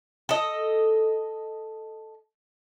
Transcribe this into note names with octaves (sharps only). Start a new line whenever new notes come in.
A4 D#5